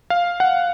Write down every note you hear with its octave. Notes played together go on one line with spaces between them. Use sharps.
F5
F#5